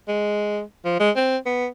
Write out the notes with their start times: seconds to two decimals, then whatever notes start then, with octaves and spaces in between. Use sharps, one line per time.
0.08 G#3
0.85 F3
1.00 G#3
1.16 C4
1.46 B3